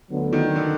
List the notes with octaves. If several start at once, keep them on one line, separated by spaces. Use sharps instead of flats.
D2 D3 F#3 B3
D#3
D3